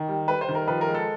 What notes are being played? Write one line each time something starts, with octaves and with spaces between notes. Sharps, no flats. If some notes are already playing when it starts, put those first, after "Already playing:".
Already playing: D#3
G3
G3 B4
C5
D#3
A#4
F3 B4
A#4
G#3
A4